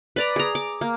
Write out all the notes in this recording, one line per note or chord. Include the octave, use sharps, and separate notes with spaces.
B4 D5 A#5
G#4 A#5
D6
A#3